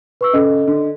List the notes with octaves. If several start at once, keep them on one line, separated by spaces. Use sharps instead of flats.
B4 C#6 E6
C#3 A4 D#5
D3